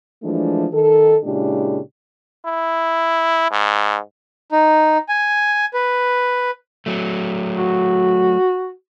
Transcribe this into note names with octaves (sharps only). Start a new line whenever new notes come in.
E3 F3 G#3 A3 D4
D#3 A4
A#2 C#3 G#3 D4 E4 G4
E4
G#2
D#4
G#5
B4
F#3 A3
F#4